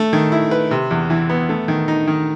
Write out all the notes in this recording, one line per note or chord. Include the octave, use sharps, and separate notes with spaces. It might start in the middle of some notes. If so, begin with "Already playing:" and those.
Already playing: A3
D#3
E4
B4
C3
E2
E3
B3
A3
D#3
D#4
D#3